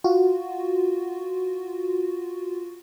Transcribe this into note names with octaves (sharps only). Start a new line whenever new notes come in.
F4 F#4